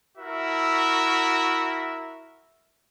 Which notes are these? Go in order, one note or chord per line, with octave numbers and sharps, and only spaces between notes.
E4 F#4 A#4 E5